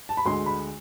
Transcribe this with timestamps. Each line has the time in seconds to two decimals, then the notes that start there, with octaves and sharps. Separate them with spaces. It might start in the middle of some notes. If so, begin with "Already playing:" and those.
0.09 A5
0.17 B5
0.25 D2 D3 G#3 C6
0.46 B5